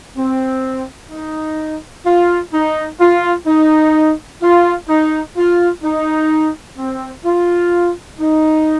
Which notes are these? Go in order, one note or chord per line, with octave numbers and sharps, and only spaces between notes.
C4
D#4
F4
D#4
F4
D#4
F4
D#4
F4
D#4
C4
F4
D#4